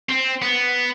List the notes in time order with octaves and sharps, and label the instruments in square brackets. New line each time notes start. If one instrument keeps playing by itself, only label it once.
[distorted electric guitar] C4
B3